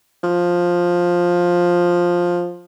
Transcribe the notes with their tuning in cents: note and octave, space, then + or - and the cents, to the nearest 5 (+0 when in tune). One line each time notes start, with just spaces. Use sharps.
F3 +10